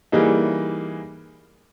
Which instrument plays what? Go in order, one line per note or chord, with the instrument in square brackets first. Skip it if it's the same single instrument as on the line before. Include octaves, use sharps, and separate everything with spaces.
[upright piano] E3 G3 A#3 D#4 G#4